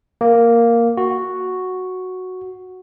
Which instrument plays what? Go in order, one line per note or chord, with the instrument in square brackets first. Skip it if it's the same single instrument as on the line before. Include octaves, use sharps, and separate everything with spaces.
[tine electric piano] A#3
F#4